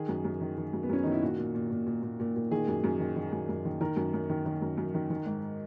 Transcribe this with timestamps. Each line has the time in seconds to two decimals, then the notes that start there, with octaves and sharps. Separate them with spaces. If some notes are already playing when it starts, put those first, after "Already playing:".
Already playing: D#3 G#4
0.08 F#2
0.25 F#2
0.41 D#3
0.57 D#3
0.73 F#2
0.83 B3
0.89 F#2 C#4
1.03 D#3 D#4
1.12 E4
1.22 A#2 F#4
1.38 A#2
1.55 A#2
1.71 A#2
1.87 A#2
2.03 A#2
2.20 A#2
2.36 A#2
2.51 D#3 G#4
2.68 F#2
2.84 F#2
3.00 D#3
3.16 D#3
3.32 F#2
3.49 F#2
3.65 D#3
3.81 D#3 A#4
3.96 F#2
4.14 F#2
4.29 D#3
4.46 D#3
4.62 F#2
4.77 F#2
4.94 D#3
5.10 D#3
5.26 G#2